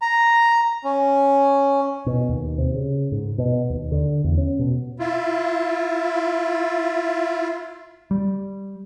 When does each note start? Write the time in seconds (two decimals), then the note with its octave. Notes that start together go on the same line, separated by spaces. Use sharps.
0.02 A#5
0.84 C#4
2.06 B2
2.29 D#2
2.58 C3
2.74 C#3
3.12 G#2
3.38 B2
3.70 D#2
3.92 D3
4.24 E2
4.37 C#4
4.59 B2
4.99 E4 F4
8.11 G3